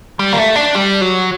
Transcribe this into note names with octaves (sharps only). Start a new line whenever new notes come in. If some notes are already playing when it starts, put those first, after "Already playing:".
G3
A#3
A3
D4
G3
F#3